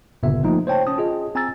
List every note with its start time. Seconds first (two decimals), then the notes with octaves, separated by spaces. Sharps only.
0.23 G1 A#2 C#3 B3 E5
0.43 F3 A3 A#3 D#4 F4
0.67 C5 C#5 G5 A5
0.87 C#4 A5 D#6
0.98 F4 G#4 D#5
1.35 C4 G#5 A#5 E6 A6